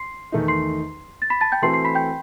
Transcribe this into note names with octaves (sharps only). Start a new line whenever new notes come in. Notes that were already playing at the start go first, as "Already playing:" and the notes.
Already playing: C6 C7
E2 D#3 A3 D#4
C6 C7
A6
B5 B6
A5 A6
G5 G6
E3 A3 C4 F#4 A4 C6 C7
C6 C7
B5 B6
G5 G6